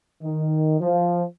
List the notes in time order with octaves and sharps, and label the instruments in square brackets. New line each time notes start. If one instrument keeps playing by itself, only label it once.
[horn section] D#3
F3